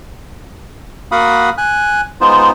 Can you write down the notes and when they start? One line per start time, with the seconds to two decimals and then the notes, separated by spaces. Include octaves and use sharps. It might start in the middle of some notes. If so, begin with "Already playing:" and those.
1.12 A#3 F#4 F5 F#5 B5 D#6
1.58 G#5 F#6
2.21 G#3 B3 D#4 F4 C5